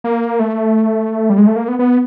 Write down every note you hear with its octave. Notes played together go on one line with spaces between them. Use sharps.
A#3
A3
G3
G#3
A3
A#3
B3
B3